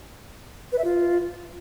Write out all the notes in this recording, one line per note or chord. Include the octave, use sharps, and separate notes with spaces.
B4
E5
F4